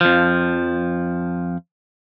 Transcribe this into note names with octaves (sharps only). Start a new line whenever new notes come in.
F2 F3